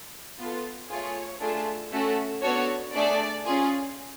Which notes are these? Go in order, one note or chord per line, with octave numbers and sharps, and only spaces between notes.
B3 F4 A4
A3 F4 G#4 C#5
A3 D4 F4 G#4
A3 C#4 F#4 A4
B3 D4 F#4 A4 C#5
A3 D4 G#4 D5
C#4 F4 G#4